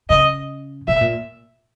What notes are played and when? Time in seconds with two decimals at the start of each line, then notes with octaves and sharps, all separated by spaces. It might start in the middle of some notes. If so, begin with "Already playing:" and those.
0.10 C#3 D#5
0.87 B2 E5
1.01 A#2